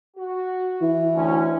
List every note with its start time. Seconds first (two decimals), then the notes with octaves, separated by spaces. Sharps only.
0.17 F#4
0.81 E3 E4
1.15 D2 C#4 G#5